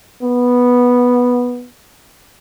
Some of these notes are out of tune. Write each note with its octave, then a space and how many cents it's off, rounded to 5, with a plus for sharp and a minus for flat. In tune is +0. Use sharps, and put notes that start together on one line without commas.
B3 -5